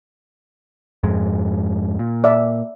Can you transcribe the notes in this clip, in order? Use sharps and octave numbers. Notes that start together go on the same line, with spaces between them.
F2 G#2 G#3
A#2
D5 E5